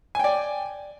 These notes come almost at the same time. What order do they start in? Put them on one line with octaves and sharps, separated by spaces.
G#5 G5 D5